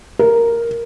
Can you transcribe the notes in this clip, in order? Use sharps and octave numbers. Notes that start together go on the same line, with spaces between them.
A#4